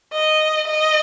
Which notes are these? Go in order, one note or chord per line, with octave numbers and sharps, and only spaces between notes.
D#5
D#5